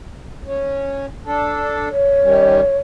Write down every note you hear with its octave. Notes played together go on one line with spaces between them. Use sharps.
C#4
D4 A4
C#5
D#3 G3 C#4